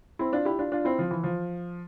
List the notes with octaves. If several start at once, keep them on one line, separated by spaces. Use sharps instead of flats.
C4 E4
D4 F4
E4 G4
D4 F4
D4 F4
C4 E4
F3
E3
F3